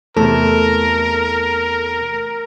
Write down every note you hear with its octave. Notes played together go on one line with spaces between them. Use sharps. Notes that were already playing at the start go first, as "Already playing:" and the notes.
E2 C3 A3 A4 A#4